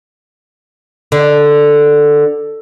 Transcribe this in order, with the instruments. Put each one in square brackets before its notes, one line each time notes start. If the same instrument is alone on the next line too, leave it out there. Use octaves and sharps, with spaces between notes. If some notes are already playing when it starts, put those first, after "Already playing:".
[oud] D3